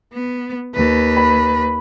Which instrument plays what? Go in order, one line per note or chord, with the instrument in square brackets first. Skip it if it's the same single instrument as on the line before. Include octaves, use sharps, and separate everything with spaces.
[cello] B3
D#2 B4
[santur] B5